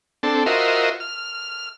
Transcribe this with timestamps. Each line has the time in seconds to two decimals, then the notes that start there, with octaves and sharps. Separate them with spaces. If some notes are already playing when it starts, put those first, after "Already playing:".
0.23 C4 D4 A4
0.46 F4 F#4 A#4 C5 D#5 E5
1.00 F6